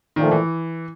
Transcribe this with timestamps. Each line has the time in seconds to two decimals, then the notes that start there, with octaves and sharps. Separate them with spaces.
0.16 A#2 D#3 F3 A3
0.31 E3